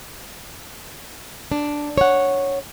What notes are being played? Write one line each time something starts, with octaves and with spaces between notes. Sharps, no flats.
D4
C#5 F#5